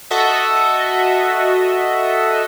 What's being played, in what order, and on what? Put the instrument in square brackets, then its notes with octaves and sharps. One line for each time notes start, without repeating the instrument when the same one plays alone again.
[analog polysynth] F#4 A4 D#5 E5